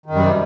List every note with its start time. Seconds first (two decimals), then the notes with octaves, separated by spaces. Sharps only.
0.06 D#3
0.10 F#2
0.15 G3
0.20 C3